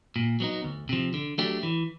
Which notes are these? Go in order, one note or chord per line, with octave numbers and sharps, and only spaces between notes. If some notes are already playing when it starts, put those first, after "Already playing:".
A#2
F#3 B3 D#4
D2
C3 F3
D3
F#3 A3 D4 G4
E3